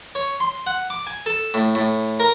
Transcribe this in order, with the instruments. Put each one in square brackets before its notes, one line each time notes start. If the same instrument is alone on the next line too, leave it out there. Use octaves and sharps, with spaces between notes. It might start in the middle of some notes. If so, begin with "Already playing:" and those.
[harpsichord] C#5
C6
F#5
D6
G#5
A4
A2
A2
A#4